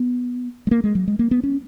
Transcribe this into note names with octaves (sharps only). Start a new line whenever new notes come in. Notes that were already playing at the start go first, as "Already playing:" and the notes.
Already playing: B3
G#3
A#3
G#3
F#3
G#3
A#3
B3
C#4